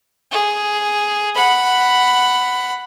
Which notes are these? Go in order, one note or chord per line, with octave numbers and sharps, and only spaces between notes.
G#4
F#5 B5